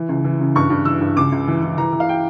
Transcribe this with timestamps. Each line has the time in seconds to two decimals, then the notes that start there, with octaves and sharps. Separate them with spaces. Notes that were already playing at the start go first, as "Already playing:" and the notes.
Already playing: E3
0.09 C#2
0.24 E3
0.40 C#3
0.55 G2 C#6
0.70 G2
0.85 E3 E6
1.01 G2
1.16 C#2 D6
1.32 C#2
1.48 E3
1.62 E3
1.78 E3 A#5
1.93 E3
2.00 F5
2.09 G5